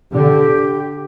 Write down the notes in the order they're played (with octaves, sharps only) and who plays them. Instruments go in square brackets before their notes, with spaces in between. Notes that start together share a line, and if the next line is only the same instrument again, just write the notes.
[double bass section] D3 [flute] G4